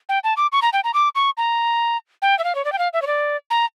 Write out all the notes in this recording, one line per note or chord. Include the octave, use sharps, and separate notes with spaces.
G5
A5
D6
C#6
A#5
G5
A#5
D6
C#6
A#5
G5
E5
F5
C#5
D5
G5
F5
E5
C#5
D5
A#5